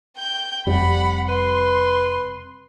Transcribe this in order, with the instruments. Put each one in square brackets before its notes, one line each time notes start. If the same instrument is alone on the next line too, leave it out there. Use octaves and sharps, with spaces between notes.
[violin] G5 G6
[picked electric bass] F1 [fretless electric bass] C3 G3 [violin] F#5 B5
[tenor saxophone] B4 [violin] C6